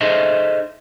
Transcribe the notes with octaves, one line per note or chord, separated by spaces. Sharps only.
D#4 G#4 A4 C5 D#5 E5